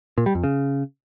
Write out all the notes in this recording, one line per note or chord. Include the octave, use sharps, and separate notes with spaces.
A#2
G3
F2
C#3